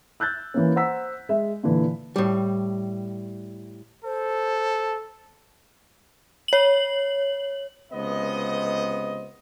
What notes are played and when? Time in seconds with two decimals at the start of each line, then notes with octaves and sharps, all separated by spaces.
0.20 E6 F#6 G6 A6
0.54 E3 A#3 C#4
0.76 C5 F#5 A#5 E6 B6
1.29 G#3 E5
1.63 A#2 D3 E3
2.16 A2 G3
4.05 A4 C5
6.48 C#5 F#7
7.93 C#2 C3 B3 C5 D#5